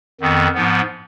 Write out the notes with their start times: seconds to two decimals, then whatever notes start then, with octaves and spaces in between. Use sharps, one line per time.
0.21 F2 D#3 B3
0.54 G#2 F3 B3